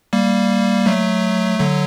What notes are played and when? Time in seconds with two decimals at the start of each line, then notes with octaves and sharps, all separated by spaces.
0.13 G3 A#3
0.86 F#3 A3
1.59 D3 F#3